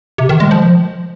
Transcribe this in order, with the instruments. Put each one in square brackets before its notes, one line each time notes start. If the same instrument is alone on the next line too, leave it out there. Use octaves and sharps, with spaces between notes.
[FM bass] C3
D#3
G#3
F3